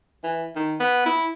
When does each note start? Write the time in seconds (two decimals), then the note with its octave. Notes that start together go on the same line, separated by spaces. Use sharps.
0.24 E3
0.56 D#3
0.80 B3
1.06 E4